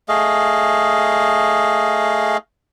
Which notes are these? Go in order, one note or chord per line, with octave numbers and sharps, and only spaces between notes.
A3 G#4 D#5 F5